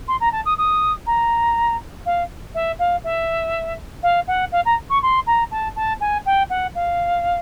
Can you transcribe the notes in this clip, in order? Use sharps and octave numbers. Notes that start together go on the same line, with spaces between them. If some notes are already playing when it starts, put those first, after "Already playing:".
C6
A#5
A5
D#6
D#6
A#5
F5
E5
F5
E5
F5
F#5
F5
A#5
C#6
C6
A#5
A5
A5
G#5
G5
F#5
F5